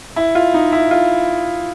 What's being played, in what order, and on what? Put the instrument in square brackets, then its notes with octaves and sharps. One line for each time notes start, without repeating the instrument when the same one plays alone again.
[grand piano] E4
F4
D#4
E4
F4